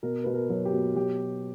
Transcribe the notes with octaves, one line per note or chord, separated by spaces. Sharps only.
B2 A#4
B2 B4
A#4
F#3
G4
B2
F#3 G4